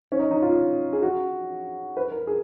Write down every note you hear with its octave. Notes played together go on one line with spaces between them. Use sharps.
C#4
D#4
D#4
F4
G#4
F#4
B4
A#4
G#4